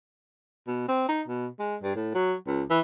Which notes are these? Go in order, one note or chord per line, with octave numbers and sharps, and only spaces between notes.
B2
C4
D#4
B2
G#3
G2
A2
F#3
C#2
E3